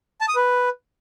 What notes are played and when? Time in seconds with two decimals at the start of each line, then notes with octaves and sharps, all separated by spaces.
0.21 A5
0.28 D#6
0.36 B4